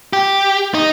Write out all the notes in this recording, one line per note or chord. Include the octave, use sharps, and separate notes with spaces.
G4
D#4